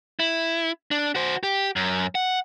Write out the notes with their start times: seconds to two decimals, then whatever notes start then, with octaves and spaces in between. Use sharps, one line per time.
0.19 E4
0.91 D4
1.15 F#4 C5
1.43 G4
1.76 F#2
2.15 F#5